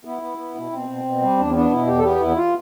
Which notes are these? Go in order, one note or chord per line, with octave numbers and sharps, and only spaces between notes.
B3 E4
B3
B3
B2
B2 C4
B2
B2
G3
E2 D4
C4
B3 D4
B2 E4
E2 G4
A4
B3 G4
E2 E4
F4